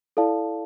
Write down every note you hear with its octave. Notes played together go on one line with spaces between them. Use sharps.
E4 A4 D5 F5 A5